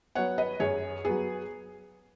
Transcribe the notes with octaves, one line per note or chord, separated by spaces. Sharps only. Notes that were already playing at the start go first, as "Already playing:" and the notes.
F#3 B3 C#5 F#5
B4 D#5
F#2 G#4 C#5
F#3 B3 G#4